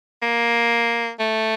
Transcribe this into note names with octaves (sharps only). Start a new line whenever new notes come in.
A#3
A3